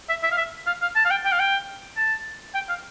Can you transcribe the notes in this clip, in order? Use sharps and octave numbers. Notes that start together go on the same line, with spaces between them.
E5
E5
F5
E5
F5
F5
A5
F5
G5
G5
F5
G5
A5
G5
F5